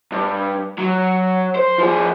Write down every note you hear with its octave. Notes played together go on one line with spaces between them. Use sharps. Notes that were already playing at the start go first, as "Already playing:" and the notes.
G2
F#3
C5
F3 G#4